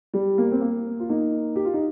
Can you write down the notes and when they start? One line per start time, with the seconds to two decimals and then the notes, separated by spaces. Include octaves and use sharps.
0.14 G3
0.38 A#3
0.52 C4
0.61 A#3
1.00 F4
1.09 A#3 D#4
1.56 G4
1.65 F4
1.74 D#4